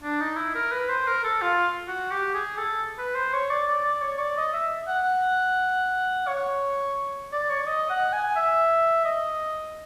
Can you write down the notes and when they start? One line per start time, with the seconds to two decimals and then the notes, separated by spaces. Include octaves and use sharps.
0.03 D4
0.21 D#4
0.37 E4
0.55 A#4
0.72 B4
0.89 C5
1.08 A#4
1.24 A4
1.42 F4
1.88 F#4
2.11 G4
2.34 G#4
2.57 A4
2.98 B4
3.15 C5
3.33 C#5
3.51 D5
3.68 D5
3.85 D5
4.02 C#5
4.19 D5
4.37 D#5
4.54 E5
4.88 F#5
6.27 C#5
7.32 D5
7.50 C#5
7.59 D5
7.67 D#5
7.90 F#5
8.13 G#5
8.36 E5
9.05 D#5